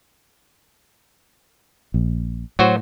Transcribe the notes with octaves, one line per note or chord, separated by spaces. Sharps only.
A#1
A2 F#3 F#4 C5